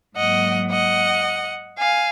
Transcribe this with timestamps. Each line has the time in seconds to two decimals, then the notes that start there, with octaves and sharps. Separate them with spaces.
0.16 G#2 F#3 A#3 D#5 F#5
0.71 D#5 F#5
1.79 F5 G#5